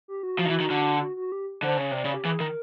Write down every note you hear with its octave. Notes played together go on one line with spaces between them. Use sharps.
G4
F#4
F3
D#3
E3
D#3
D3
F#4
F#4
G4
D3 C5
C#3 C#5
C3 D5
C#3
G4
E3 G#4
D#3 A#4